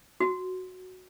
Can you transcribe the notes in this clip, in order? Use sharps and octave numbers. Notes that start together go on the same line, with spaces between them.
F#4